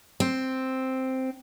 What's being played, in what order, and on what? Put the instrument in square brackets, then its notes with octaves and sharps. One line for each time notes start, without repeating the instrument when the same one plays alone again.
[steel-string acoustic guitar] C4